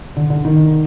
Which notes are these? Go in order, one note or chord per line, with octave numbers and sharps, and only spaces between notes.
D3
D3
D#3